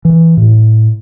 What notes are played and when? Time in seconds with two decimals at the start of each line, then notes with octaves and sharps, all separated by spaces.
0.05 E3
0.37 A2